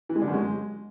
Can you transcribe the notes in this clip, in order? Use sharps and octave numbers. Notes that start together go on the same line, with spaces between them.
E3
G#3
D3
F#2
G#3